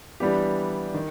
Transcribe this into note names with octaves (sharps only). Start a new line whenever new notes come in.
E3 G3 B3 D4 G4
D#3